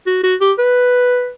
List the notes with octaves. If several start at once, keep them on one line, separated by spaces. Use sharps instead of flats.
F#4
F#4
G4
B4